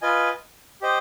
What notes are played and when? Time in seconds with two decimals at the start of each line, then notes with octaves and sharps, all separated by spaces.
0.02 F4 B4 D#5 G#5
0.81 G4 C5 D#5